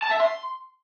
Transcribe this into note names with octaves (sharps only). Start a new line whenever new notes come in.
A5
E5
C6